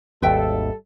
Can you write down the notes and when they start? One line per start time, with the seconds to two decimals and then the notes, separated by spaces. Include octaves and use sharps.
0.22 G#1 D#2 G3 A4 B4 E5 G5